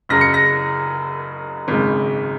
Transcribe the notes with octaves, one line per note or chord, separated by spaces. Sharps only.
F#1 F#2 C#3 A#6
C#7
A#6
G#1 F#2 C#3 G#3